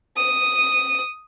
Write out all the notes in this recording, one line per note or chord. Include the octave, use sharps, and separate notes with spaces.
D#6